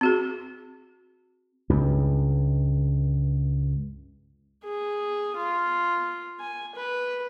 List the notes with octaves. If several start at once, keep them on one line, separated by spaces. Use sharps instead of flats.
C4 F#4 G#4
C#2 G2
G#4
F4
G#5
B4